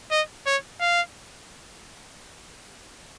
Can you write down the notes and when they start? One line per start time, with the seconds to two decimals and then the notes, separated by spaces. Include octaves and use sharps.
0.11 D#5
0.46 C#5
0.80 F5